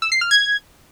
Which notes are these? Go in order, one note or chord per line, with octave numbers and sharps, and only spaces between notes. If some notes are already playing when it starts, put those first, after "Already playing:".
E6
C7
F6
G#6